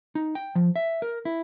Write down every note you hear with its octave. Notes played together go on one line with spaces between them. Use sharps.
D#4
G5
F3
E5
A#4
E4